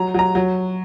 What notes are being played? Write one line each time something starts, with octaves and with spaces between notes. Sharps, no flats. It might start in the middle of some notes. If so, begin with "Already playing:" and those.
Already playing: F#3 A#5
F#3 A#5
F#3